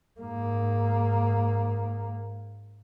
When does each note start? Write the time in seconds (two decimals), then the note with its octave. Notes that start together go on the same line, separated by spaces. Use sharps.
0.20 G#2 A#3